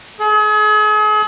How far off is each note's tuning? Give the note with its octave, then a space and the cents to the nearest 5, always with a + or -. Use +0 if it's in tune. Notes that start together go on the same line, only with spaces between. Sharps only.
G#4 +40